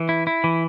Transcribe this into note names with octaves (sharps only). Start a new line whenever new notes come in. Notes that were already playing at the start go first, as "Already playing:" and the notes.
Already playing: E3
E4
E4
E3